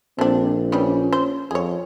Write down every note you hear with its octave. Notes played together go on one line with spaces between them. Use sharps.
A#1 A3 C4 D4
D#3 E3 G3 C#4
C5
F2 G#4 C#5